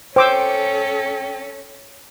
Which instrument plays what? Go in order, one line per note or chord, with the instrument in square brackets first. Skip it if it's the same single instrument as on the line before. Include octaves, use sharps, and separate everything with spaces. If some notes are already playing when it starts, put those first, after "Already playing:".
[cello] C#4 A4 [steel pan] C5 D6 E6 [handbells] G5